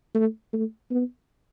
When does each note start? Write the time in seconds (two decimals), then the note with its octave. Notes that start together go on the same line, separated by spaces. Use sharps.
0.15 A3
0.53 A3
0.91 B3